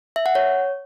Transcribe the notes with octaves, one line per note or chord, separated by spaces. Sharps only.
E5
F#5
C#5